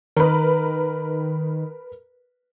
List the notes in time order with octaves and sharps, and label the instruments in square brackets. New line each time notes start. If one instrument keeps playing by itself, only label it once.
[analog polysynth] D#3 [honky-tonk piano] A#4 B4